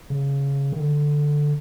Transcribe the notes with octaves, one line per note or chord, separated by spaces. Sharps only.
C#3
D#3
D3